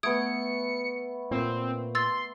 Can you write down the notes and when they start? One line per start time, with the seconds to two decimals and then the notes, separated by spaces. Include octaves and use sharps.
0.03 A3 B3 D#6 G#6 C#7 D7
1.31 A#2 C4
1.95 C6 E6 A6